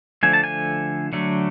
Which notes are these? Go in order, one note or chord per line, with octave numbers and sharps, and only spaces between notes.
D3 F3 A3 G#5
A5
G#5
D3 F#3 A3